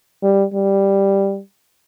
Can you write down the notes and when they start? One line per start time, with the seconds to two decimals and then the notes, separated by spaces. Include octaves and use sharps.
0.23 G3
0.54 G3